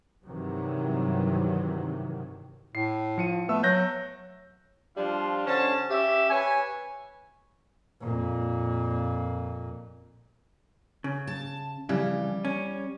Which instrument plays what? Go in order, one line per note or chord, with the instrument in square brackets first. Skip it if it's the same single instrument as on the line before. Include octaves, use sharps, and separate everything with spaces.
[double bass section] G2 C3 D#3 E3 F#3
[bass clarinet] A2 [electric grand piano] C7
[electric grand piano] F3 C#7 D#7
[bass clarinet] A3 [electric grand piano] B3 E6
[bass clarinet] F#3 [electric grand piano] F#6 G6 A#6
[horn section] F3 G3 D4 F4
D3 C#4 C5 A5
C#4 G4 E5
B4 C#5 G#5
[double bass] F2 A#2
[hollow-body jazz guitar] C#3
[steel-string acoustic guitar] A5
[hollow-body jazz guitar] F2 C#3 E3 [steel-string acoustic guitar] G3
[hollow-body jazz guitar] C#4